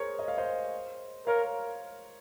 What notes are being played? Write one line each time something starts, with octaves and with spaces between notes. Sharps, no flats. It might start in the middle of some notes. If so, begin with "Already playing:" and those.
Already playing: G#4 A#4 C5 C#5
D#5
F5
C5 D#5
A#4 C#5 F5